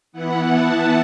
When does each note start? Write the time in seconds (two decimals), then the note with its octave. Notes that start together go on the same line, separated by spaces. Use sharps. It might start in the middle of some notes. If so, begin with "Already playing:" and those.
0.12 E3 B3 E4 F#5
0.49 A5